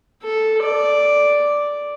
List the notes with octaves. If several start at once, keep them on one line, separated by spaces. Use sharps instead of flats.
A4
D5